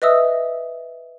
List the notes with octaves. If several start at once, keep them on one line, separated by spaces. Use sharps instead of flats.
B4 D#5 E5 D#6 E6